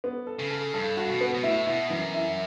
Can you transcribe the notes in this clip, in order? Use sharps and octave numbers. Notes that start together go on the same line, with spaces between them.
B3
A4
C#3
A4
G2 A4
F#4
B2
B3
B2
A2 E4
B2 E4
F#2 E3
E4